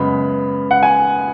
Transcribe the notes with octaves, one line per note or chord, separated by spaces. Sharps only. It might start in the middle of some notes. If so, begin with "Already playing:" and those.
Already playing: F#2 C#3 G#3 B3 B5
F#5
G#5